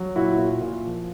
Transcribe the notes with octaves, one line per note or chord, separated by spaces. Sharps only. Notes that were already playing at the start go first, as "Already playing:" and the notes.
Already playing: F#3
A#2 E4 F#4
A#2
A#2
F3